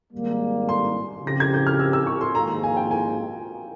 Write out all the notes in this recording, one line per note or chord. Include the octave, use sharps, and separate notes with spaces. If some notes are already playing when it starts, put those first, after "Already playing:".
G#1 G#2 G3 A#3
C6
C#3 F3 C4 G4 A#6
G#6
G6
F6
E6
E6
C#6
C6
G#1 G#2 F3 A#3 F4 A#5
G#5
G5
G#5